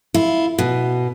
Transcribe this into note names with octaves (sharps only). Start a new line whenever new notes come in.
E4 F4
B2